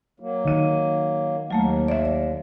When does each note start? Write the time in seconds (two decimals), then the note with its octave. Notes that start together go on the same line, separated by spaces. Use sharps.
0.20 F#3 A#3
0.45 D#3 D#7
1.51 D#2 F#3 A3 A#3
1.88 D5 E5